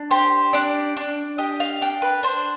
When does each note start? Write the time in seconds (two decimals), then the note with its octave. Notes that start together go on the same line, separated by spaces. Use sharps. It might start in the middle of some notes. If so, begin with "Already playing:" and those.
Already playing: D4
0.11 G4 C5
0.53 D4 D5
0.97 D4
1.38 G4 D#5
1.60 F5
1.82 D4 G5
2.02 B4
2.23 D4 C5